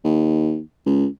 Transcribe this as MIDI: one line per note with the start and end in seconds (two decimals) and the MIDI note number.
0.04 0.60 39
0.86 1.06 37